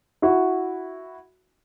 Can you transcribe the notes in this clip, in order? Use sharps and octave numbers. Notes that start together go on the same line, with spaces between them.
E4 F#4